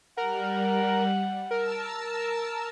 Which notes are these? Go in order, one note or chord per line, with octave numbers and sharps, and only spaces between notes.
G3 A#4 F#5
A#4 A5 E6